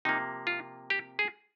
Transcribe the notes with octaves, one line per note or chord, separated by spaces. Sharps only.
C3 F3 A#3 D#4
F4
G4
G#4